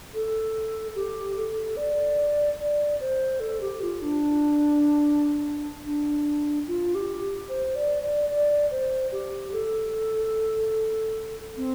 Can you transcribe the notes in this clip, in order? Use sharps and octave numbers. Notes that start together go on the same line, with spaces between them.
A4
G4
A4
D5
D5
C5
A4
G4
F4
D4
D4
F4
G4
C5
D5
D5
D5
C5
G4
A4
C4